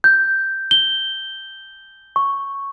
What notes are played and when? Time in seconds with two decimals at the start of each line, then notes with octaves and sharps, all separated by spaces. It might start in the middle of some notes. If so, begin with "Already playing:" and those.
0.04 G6
0.71 G7
2.16 C#6